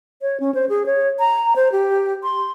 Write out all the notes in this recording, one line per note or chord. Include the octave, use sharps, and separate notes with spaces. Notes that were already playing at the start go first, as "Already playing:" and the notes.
C#5
C#4
C5
G#4
C#5
A#5
C5
G4
C6